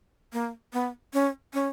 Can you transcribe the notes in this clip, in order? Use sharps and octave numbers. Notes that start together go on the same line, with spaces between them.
A#3
B3
C#4
C#4